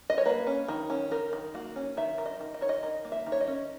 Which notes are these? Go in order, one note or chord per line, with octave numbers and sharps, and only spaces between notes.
D#5
C#5
A#3 B4
C#4
D#3
C#4
D#3 A#4
D#3
A#3 F#4
C#4
D#3 E5
D#3
D#5
D#3
D#5
D#3 C#5
D#5
D#3 D#5
A#3
E5
D#3
C#5
D#5
C#4